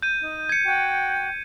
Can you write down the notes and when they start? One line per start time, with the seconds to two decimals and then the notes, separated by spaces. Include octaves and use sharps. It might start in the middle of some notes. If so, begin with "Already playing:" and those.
0.02 G6 D#7
0.20 D#4
0.49 G#6 C#7
0.65 F#4 G5